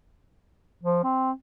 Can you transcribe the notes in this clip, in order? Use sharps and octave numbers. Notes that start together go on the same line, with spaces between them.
F3
C4